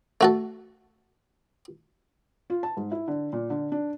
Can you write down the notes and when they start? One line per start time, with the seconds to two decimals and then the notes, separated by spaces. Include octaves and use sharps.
0.21 A3 F#4 A4
2.50 F4
2.63 A5
2.77 G#2
2.92 E4
3.08 D3
3.33 A#2
3.50 D3
3.72 D4